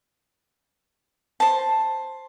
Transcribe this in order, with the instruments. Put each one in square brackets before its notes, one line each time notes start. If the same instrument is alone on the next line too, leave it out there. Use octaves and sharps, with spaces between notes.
[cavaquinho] C5 A5